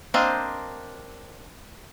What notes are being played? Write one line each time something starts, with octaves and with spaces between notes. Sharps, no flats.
A#3 C4 D4 C5 D#5